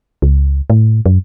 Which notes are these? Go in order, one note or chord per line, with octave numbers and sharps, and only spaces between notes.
C#2
A2
F#2